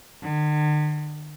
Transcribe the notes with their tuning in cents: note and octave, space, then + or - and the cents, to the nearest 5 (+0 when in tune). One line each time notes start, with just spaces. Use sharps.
D3 +45